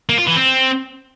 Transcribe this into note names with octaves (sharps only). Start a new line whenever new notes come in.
A#3
F4
E3
C4